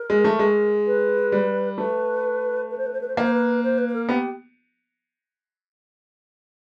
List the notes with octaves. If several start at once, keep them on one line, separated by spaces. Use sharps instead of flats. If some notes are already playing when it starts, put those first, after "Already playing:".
Already playing: A#4
G#3
A3
G#3
B4
G3
A3 B4
B4
C5
B4
C5
B4
C5
A#3 B4
C5
B4
C5
B4
B4
A#4
B3 G4